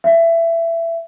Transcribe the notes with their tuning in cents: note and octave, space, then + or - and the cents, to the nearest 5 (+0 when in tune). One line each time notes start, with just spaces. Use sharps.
E5 +20